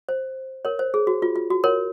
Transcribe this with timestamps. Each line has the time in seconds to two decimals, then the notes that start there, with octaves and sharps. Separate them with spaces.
0.09 C5
0.65 A#4 C#5
0.79 C5
0.94 G#4
1.07 F#4
1.22 F4
1.36 F4
1.50 F#4
1.64 A#4 C#5